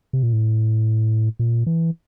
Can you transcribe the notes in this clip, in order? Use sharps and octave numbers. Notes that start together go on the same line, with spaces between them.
C3
A#2
A2
A#2
E3